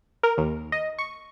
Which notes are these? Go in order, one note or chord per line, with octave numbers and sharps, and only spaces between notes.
A#4
D#2
D#5
C#6